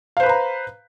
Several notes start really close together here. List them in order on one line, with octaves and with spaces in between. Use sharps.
F5 C5 B4 B5 A#5